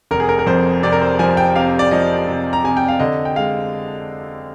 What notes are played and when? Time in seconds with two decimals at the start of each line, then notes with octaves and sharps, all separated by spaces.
0.11 F1 A#4
0.20 G#4
0.29 A#4
0.39 A#4
0.47 F2 C5
0.83 C3 D5
0.92 A#4
1.01 C5
1.19 F3 G#5
1.37 G5
1.55 C3 F5
1.79 D5
1.91 F3 D#5
2.27 C3
2.53 A#5
2.64 C3 G#5
2.77 G5
2.88 F5
3.00 D3 D#5
3.25 G5
3.36 G#3 F5